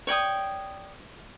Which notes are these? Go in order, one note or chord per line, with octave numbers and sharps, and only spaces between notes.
C#5 D5 G5 D#6